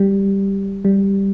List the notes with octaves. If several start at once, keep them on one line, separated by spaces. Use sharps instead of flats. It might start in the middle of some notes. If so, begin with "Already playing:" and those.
Already playing: G3
G3